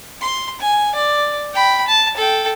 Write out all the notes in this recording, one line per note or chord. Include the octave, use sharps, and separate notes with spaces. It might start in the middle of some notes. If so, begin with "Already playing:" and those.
C6
G#5
D5
G5 B5
A5
A4 G5